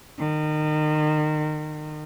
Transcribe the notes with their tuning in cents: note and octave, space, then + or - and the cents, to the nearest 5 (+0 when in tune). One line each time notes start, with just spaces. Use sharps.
D#3 -30